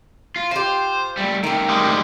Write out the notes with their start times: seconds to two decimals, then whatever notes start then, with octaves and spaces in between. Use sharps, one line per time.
0.36 F4
0.51 F4 G4 C5
1.17 G3 A3
1.43 D#3 A3 G4 A#4
1.69 G3 G#3